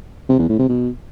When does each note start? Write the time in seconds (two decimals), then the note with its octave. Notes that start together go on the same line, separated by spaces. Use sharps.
0.29 C3
0.39 E2
0.49 A2
0.59 C3
0.69 B2